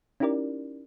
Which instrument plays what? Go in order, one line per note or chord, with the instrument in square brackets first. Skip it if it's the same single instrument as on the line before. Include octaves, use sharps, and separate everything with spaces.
[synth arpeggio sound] C#4 D#4 E4 G4 A#4 D5